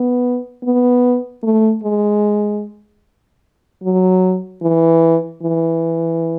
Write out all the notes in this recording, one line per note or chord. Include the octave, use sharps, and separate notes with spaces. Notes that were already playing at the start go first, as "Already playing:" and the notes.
Already playing: B3
B3
A3
G#3
F#3
E3
E3